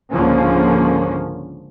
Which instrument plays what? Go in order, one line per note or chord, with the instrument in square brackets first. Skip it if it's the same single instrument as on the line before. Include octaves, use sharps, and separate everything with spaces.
[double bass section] C#2 G#2 D3 F3 A#3 C#4